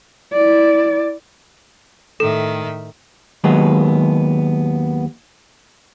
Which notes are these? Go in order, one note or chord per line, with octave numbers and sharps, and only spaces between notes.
E4 D5
A2 D#3 A4 E5
D#2 F#3 G#3 B3